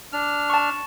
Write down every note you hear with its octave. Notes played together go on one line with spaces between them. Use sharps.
D4 F6
A5 C#6